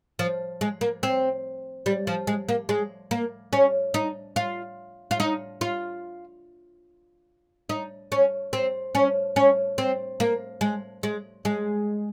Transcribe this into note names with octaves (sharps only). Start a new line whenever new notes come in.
F3
G#3
A#3
C4
G3
F3
G#3
A#3
G#3
A#3
C#4
D#4
F4
F4
D#4
F4
D#4
C#4
C4
C#4
C#4
C4
A#3
G#3
G#3
G#3